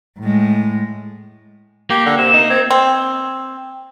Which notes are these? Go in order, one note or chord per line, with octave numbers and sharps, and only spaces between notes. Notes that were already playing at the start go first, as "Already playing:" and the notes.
A2 G#3
A#3 G4
D3 F#5
C3 E7
D#4
C4 G#6
C4